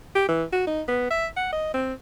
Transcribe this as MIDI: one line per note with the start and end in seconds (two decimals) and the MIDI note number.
0.15 0.25 67
0.29 0.44 52
0.53 0.66 66
0.67 0.82 63
0.88 1.09 59
1.11 1.26 76
1.37 1.50 78
1.52 1.70 75
1.74 1.93 60